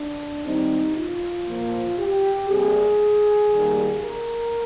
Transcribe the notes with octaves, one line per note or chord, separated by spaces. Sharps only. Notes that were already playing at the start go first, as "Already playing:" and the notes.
Already playing: D4
D#3 G3 C4 D#4
F4
A#2 F3 A#3
G4
C3 G3 A#3 G#4
D#3 G3 A#3
A#4